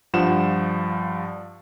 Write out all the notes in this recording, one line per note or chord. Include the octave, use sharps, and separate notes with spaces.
G2 F3 F4 F#5 E7